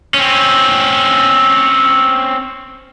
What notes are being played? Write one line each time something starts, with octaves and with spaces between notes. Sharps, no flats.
C4 C#4